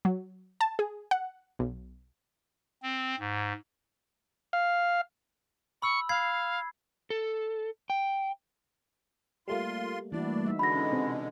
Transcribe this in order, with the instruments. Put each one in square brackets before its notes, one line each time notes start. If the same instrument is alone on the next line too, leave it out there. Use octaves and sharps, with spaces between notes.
[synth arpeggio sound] F#3
A5
G#4
F#5
B1
[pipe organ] C4
G#2
[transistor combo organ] F5
[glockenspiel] B5 E6 [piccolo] C#6
[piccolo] F5 [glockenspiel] B5 G#6 C7
[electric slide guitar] A4
G5
[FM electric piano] G3 A3 A#3 [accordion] F4 C6
[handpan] E3 E4 F#4 [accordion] D4 D5
[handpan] D#4 E5
[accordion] B2 D3 G#3 [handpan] D4 [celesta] B5 A#6
[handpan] C#4 D#4
[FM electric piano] C3